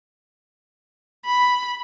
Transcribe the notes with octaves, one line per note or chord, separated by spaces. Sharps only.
B5